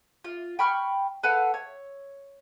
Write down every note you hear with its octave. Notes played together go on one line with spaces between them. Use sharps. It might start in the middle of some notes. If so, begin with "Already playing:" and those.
F4
G5 B5 C#6 F6
A4 B4 F5 F#5
C#5